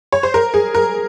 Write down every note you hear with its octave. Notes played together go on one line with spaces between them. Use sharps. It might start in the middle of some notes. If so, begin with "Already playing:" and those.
C#5
C5
A#4
G#4
A#4